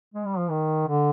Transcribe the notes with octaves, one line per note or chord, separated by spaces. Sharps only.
G#3
G3
F3
D#3
D3